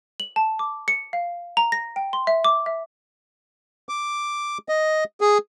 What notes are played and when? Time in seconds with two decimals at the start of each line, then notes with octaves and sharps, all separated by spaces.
0.20 F#7
0.36 A5
0.59 D6
0.88 C#7
1.13 F5
1.57 A#5
1.72 A#6
1.96 G5
2.13 C6
2.27 E5
2.45 D6
2.66 E5
3.89 D6
4.69 D#5
5.21 G#4